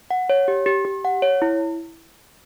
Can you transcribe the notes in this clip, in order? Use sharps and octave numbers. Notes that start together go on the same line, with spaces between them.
F#5
C#5
G4
G4
G4
F#5
C#5
E4